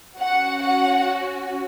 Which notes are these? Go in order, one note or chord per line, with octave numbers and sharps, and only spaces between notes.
C#4 F#4 F#5
F#5